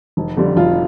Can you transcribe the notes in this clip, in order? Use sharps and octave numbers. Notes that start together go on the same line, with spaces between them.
F1
F2 D3 G3
F1 F4